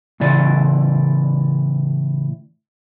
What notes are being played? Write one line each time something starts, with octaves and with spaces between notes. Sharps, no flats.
A2 C#3 E3 D5